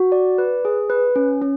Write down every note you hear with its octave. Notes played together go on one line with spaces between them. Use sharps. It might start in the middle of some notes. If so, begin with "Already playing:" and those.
Already playing: F#4
D5
B4
G#4
B4
C#4
C#4